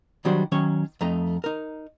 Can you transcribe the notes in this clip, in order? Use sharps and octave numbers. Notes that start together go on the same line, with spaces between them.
D#3 F#3 G3 D4 F#4 C5
D#3 F#3 C#4 C#5
F2 A3 D#4 A#5
D#4 A#4